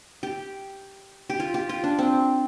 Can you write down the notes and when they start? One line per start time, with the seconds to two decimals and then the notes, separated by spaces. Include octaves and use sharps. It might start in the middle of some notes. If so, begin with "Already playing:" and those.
0.23 G4
1.30 G4
1.40 F4
1.54 G4
1.69 F4
1.84 D4
1.99 C4